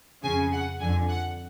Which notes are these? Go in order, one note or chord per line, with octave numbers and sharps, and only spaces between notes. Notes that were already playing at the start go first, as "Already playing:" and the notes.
F2 C#3 G#5
F#5
F2 D3 G#5
F#5